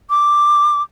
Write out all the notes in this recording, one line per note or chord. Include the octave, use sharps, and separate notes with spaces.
D6